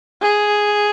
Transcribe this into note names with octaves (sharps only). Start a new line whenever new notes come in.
G#4